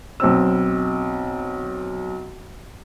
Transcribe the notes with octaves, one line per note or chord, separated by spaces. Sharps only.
B1 C4 E6